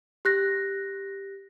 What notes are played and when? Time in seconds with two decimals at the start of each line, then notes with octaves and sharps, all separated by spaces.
0.25 G4 F#6 A#6